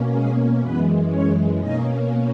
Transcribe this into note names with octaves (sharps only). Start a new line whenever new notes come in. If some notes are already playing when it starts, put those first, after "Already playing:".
Already playing: B2 A#3 C#4
G#3 G#4
F#2 E3 G#3 B3 B4
C#4 C#5
B2 A#3 C#4 D#4 D#5